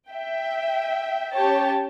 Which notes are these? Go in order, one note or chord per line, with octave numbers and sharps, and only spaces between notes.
E5 G5
C#4 G4 C#5 G5 A5